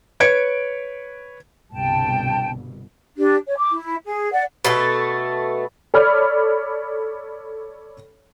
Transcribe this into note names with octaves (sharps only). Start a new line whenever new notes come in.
B4 C#5 G#6 C#7 D7
G1 C2 B2 G5 A5
D4 G4
C#5
D6
E4
G#4
D5 F#5
B2 A3 A4
A4 C#5 D5 B5 F6